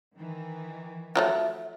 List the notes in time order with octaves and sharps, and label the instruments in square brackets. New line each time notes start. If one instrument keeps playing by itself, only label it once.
[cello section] D#3 E3
[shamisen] F3 F#3 A3 [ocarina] E5